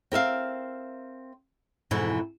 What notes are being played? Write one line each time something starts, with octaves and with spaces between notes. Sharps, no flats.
C4 A#4 E5 F5
F2 G#2 B2 E3 E4